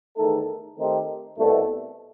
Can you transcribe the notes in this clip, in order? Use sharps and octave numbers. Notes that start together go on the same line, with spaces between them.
E2 D#3 A3 D#4 A4
D#3 A3 C4 D#4 G4
C2 B2 A3